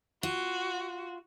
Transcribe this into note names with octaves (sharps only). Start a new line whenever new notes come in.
F4 F#4